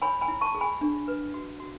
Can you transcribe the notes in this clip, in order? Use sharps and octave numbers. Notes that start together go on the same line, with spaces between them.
C#5 G#5 B5
G#5 B5
E4
A5 C#6
G#4
G#5 B5
D4
B4
F#4
F#4